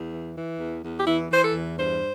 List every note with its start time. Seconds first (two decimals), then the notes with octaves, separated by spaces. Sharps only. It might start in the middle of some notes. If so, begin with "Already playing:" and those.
Already playing: E2
0.12 E3
0.36 E3
0.59 E2
0.83 E2
0.99 G4
1.06 E3 E4
1.31 E3 C5
1.42 A4
1.54 E2
1.77 G2 C5